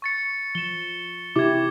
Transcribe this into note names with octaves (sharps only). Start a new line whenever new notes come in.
C#6 A6 C#7
F3 E7 G7
C3 E4 G4 D6 G#6